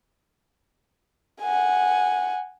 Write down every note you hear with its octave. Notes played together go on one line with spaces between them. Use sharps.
F#5 G#5